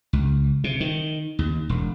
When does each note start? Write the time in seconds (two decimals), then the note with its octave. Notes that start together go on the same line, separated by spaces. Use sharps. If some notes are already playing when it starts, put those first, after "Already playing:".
0.13 C#2
0.64 C3
0.80 D#3
1.39 D#2
1.69 E1